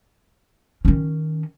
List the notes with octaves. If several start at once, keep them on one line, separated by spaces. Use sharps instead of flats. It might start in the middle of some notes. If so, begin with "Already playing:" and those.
D#3 C#4